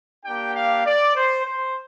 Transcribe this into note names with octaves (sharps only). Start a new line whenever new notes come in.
A#3 D4 G4 G5
F5
D5
C5
C5